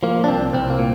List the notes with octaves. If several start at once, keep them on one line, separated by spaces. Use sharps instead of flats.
F3 A#3
D4
C2 C4
C2 C4
A#3
A#2